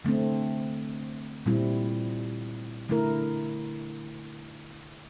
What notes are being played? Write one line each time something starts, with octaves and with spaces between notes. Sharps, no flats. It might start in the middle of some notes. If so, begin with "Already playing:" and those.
D3 A3 C4
A#2 G3 C4 E4
D3 A3 E4 A#4